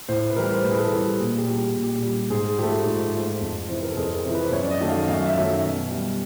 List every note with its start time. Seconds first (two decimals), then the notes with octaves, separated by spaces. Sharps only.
0.09 A2 C5
0.30 B4
0.36 E3 G3 A#4
0.54 C5
0.64 A2 B4
0.71 G#4
0.78 A4
0.92 E3 G3 G#4
1.06 G4
1.19 A#2 G#4
1.38 G4
1.47 G3
1.57 G4
1.75 A#2
1.84 G4
2.03 G3
2.30 G#2 G#4
2.58 F3 A3 G4
2.86 G#2
3.13 F3 A3
3.41 F2
3.69 C3 E3 C5
3.76 B4
3.83 A#4
3.90 A4
3.97 F2 G#4
4.15 A#4
4.25 C3 E3
4.34 B4
4.45 C5
4.52 F#2 C#5
4.64 D5
4.71 D#5
4.80 D#3 F#3 A3
4.89 F5
5.08 F#2 F5
5.26 E5
5.36 D#3 F#3 A3
5.45 E5
5.63 B2
5.91 G3